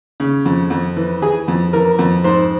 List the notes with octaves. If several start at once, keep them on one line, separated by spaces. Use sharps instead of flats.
C#3
F2
F2
E3
E3 G#4
F2
E3 A#4
F2
G#2 C5